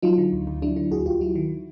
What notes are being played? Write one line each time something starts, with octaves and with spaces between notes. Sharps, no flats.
F#3 D#4 F4
D3
D2
D2
F#3 D4 E4
D3 D4 E4
D2 F#4 G#4
D2 F4 G4
F#3 E4 F#4
D#3